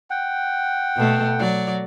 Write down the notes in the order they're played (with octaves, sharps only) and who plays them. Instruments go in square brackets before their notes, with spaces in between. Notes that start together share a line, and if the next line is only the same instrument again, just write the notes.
[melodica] F#5 G5
[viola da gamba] B2 A3
F#3 D5